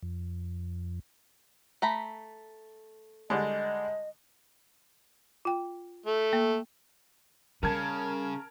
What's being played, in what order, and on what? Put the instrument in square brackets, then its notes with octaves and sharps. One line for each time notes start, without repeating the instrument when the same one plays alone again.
[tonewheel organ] F2
[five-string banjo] A3 A#5 B5
[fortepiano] D3 G3 G#3 [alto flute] D#5
[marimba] F4 G5
[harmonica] A3
[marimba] A#3
[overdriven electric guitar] C#3 [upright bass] G3 [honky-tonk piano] A#4 A5 G#6